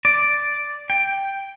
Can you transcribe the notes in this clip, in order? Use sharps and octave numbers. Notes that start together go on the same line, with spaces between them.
D5
G5